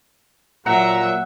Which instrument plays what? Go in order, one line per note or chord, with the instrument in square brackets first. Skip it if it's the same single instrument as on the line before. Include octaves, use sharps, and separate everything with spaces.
[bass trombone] A#2 [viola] F#3 E5 [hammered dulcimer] F#5 [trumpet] A#5